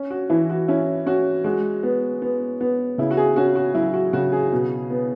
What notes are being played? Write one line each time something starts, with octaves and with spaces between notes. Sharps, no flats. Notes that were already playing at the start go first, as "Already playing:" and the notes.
Already playing: C#4
F#4
E3 E4
F#4
C#4 E4
C#4 F#4
G#3 F#4
B3
B3
B3
C#3 E4
F#4
G#4
C#4 F#4
F#4
F#3 E4
F#4
C#3 F#4
G#4
B2
B3